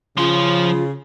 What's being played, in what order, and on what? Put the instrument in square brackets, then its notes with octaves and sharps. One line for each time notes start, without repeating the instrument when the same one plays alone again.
[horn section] C#3 [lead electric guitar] F3 C6 [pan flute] F4